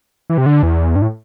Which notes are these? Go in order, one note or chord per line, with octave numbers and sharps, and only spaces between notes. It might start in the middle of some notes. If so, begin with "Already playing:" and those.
E3
C3
D3
E2
G2
A2